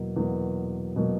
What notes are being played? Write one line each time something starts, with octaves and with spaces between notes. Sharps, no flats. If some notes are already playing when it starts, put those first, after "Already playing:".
Already playing: E2 B2 F#3 A#3
E2 B2 F#3 A#3
B2 F#3 A#3